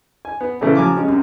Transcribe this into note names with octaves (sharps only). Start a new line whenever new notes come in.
G#5
B3
A#2 C#3 E3 A3 B3
C#3 F3 F#3 G#5 A#5 D6
G#3 C#4 G4
F#2 C3